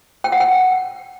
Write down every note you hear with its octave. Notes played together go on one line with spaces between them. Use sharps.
G5
F#5
G5